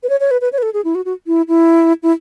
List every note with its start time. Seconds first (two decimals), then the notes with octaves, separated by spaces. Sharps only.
0.03 B4
0.09 C#5
0.20 C#5
0.31 B4
0.41 B4
0.52 C#5
0.58 B4
0.63 A4
0.74 G#4
0.85 E4
0.95 F#4
1.05 F#4
1.27 E4
1.48 E4
2.03 E4